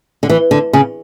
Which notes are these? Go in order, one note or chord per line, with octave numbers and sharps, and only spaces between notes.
D3
E3
D3
C#3